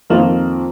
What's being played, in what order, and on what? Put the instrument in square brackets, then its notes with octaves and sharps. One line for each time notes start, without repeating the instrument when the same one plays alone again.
[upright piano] F2 D#3 A#3 F4 A#4 [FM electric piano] F3